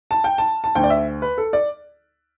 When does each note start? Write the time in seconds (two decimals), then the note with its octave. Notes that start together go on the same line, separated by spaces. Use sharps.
0.11 A5
0.24 G5
0.38 A5
0.64 A5
0.75 D2 D3 G5
0.83 D5
0.90 E5
1.22 B4
1.38 A4
1.53 D5